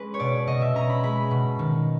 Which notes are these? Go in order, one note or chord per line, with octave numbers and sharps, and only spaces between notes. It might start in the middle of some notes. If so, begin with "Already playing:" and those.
Already playing: G#3 C#4 B4
C#5
B2 D5
B2 D#5
E5
C#4 A#5
B5
G#3 B5
B2
D#3